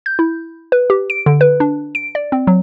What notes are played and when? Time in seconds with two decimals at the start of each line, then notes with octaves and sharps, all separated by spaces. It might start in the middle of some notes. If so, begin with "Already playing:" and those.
0.06 G6
0.19 E4
0.72 B4
0.90 G4
1.10 D7
1.26 D3
1.41 B4
1.60 D4
1.95 D7
2.15 D5
2.32 C4
2.47 F#3